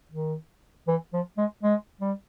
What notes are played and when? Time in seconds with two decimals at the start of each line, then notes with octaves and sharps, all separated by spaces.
0.12 D#3
0.88 E3
1.13 F3
1.38 G#3
1.63 G#3
2.01 G3